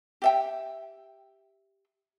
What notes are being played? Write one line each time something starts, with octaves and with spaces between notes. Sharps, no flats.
G4 E5 G5